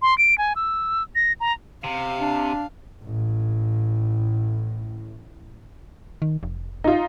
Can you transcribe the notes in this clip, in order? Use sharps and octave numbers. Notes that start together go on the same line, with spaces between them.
C6
D7
G#5
E6
A#6
A#5
C3 F5
D4
A1 A2
D#3
F1
D#4 F4